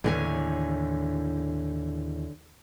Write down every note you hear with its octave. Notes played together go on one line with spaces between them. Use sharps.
D#2 A2 D3 E3 C#5 G#5